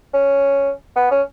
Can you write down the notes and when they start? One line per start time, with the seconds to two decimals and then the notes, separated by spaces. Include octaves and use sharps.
0.14 C#4
0.96 B3
1.11 C#4